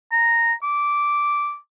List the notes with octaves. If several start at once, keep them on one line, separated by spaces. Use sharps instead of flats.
A#5
D6